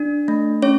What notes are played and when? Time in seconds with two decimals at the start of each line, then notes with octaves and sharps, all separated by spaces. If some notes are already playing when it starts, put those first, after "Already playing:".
Already playing: D4
0.28 A3
0.62 C#4 C#5